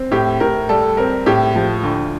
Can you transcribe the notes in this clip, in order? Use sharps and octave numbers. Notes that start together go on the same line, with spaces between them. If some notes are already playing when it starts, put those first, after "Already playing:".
Already playing: C4
A2 G4
A2 A#4
G3 A4
C4 A#4
A2 G4
F3
D2